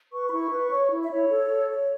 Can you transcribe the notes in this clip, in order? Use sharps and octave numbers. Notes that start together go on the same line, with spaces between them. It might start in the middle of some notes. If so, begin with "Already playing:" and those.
B4 C#6
B5
E4 C#6
B4
C#5
E4
E5
E4 C#5
A4
A4
C#5